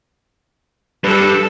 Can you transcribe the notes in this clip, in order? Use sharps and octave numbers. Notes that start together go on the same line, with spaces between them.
G3 A4 B4